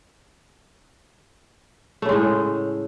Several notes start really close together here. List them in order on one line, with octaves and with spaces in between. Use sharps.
A3 C#3 G#3 A2